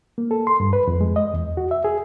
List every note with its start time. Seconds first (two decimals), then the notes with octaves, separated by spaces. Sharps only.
0.18 A#3
0.31 A4
0.47 C6
0.60 G2
0.73 B4
0.87 F2
1.01 G#3
1.16 D#5
1.34 E2
1.57 F#4
1.71 E5
1.84 G#4